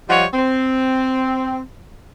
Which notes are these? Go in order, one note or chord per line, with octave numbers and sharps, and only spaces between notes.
F3 G3 C#5 D#5 F#5
C4